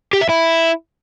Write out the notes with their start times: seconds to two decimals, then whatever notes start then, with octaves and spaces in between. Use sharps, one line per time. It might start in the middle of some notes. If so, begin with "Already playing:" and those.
0.13 G4
0.21 E5
0.29 E4